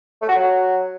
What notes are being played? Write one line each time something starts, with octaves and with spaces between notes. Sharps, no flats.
A3
F#4
F#3